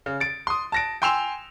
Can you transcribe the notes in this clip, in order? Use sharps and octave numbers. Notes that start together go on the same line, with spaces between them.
C#3
A6 D7
C6 D#6
A5 A#6 D7
G5 G#5 C6 E6 E7 F7